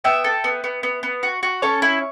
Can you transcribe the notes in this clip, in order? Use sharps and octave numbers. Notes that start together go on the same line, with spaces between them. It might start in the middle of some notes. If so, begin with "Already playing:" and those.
B3 E5 G5
A4
B3
B3
B3
B3
F#4
F#4
C#4 A4 C#5
E4